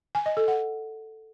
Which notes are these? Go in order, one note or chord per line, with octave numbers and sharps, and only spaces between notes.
G#5
D#5
A4
F#5